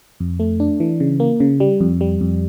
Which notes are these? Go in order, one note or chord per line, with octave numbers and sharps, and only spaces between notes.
F2
A3
D4
E3
C#3
A#3
C#3
G3
F2
G3
F2